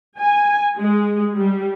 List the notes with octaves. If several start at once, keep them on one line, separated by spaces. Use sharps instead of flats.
G#5
G#3
G3